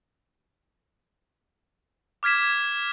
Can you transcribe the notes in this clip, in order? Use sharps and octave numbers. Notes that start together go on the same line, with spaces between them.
D6 F6 G#6 B6 E7